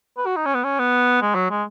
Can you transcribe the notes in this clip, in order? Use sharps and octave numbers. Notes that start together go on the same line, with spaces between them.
B4
F#4
D#4
C#4
B3
C#4
B3
G#3
F#3
G#3